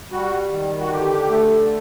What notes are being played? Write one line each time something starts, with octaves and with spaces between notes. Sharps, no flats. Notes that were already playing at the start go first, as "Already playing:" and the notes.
G3 F#4
D#3
F#4
D3 G4
A3